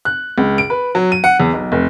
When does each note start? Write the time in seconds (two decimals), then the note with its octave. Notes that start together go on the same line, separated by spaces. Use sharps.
0.05 F#6
0.38 C#2
0.58 D7
0.70 B4
0.95 F#3
1.12 D#7
1.24 F#5
1.40 E2
1.53 B1
1.72 F1